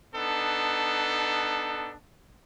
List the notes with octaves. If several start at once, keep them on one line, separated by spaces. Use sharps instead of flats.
B3 D4 D#4 A4